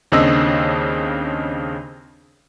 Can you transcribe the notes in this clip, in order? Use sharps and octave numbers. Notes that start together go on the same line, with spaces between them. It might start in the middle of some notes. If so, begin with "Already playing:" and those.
D#2 C#3 C4 D4 D#5 E6